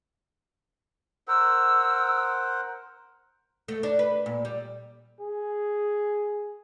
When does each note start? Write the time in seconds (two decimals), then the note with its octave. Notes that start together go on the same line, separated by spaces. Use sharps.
1.28 A#4 C5 F#5 E6
3.68 A3
3.83 D4
3.99 B4
4.26 A#2
4.45 G3
5.20 G#4